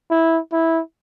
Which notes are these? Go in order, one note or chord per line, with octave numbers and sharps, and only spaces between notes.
E4
E4